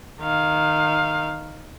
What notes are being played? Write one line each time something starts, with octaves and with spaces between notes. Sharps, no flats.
D#3 F5